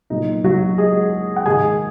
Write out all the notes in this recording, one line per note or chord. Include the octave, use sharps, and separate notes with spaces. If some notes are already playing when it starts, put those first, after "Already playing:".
A#2 F#3 D#4
F#3 F#4
G#3 G#4
F#5
G#2 D#3 G#3 G#4 G#5